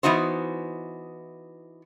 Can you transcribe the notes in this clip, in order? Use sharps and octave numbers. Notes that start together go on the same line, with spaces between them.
E3 B3 D#4 F#4 C5